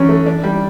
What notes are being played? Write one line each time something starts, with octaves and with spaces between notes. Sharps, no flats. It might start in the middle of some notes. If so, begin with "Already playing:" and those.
Already playing: F#2 E3 C#4
A3
D4
G3